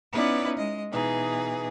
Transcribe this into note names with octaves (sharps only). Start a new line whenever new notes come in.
B3 C#4 D#4 E4 B4 D5
G#3 D#5
B2 E3 D#4 G#4